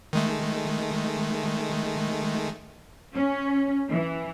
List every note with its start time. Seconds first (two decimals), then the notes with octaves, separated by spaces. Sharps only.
0.13 D#3 G#3 A3
3.13 C#4
3.90 E3